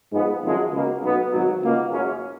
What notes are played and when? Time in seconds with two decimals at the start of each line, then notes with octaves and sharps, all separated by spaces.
0.12 G#2 F3 G#3 B3
0.42 G#1 F#2 F3 G#3
0.71 C#2 B2 A#3
1.01 B1 B2 F#3 B3
1.32 G#1 G#2 F#3
1.61 C#2 B2 A#3 F4
1.90 F#1 F#2 C#3 G#3 C#4